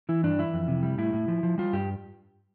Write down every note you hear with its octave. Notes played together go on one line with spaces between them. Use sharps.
E3 E4
G2 D4
E3 E4
F2
C3
G3
A2 E4
A2
F3
F3
G3 F4
G2 G4